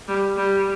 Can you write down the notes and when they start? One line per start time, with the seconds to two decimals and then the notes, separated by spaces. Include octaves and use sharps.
0.08 G3
0.37 G3